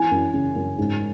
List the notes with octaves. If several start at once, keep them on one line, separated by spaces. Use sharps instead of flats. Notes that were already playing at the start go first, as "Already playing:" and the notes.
Already playing: E3 G#5
F#2
C#3
F#2
G#2